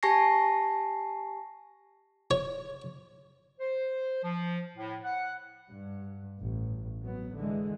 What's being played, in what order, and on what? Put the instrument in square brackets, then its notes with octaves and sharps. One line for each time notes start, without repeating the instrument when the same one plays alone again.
[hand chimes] G4 G#5 A5 C#6 A#6 C7
[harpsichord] C#5
[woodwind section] C5
F3
A2
F#5
[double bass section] G2
A1
F#3 B3
D3 E3 G#3